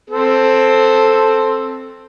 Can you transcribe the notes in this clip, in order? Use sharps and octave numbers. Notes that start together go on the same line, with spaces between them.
C4 A4